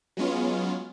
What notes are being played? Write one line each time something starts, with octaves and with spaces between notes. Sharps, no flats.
F#3 G#3 B3 C#4 F4